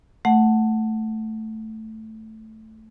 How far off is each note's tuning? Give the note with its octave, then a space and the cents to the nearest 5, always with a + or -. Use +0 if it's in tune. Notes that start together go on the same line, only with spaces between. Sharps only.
A3 +0 F#5 +0